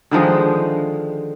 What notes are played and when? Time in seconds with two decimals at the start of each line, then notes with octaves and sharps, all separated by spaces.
0.11 D3 D#3 F3 G#3